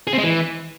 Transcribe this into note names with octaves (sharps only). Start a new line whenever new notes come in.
G#4
C4
G#3
E3